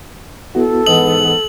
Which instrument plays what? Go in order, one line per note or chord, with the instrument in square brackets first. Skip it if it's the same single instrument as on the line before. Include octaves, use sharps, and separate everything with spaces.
[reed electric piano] B3 E4 F#4 [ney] A4
[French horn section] G#2 B3 [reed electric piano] E3 D#5 D#6 [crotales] F#7